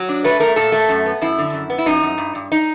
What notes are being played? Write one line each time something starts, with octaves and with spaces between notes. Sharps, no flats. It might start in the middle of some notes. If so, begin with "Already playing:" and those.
Already playing: F#3
D4
A3 B4
A3 A#4
A#2 A4
A3
F#2
B3
F#2 E4
D3
F#2
B3
E4
F#2 D#4
F#2
G2
G2
D#4